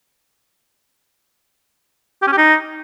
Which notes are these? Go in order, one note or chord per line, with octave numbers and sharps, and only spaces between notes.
G4
C#4
G4
D#4